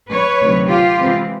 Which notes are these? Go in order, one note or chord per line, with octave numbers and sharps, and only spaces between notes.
B4 C#5
D2 C3 D#3 F#3
F4 G4
C3 E3 G#3 C4